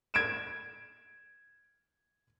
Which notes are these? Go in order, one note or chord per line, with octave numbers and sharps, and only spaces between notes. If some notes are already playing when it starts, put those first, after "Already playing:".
G#6 D7 E7